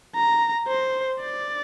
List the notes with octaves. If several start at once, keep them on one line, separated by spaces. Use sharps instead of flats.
A#5
C5
D5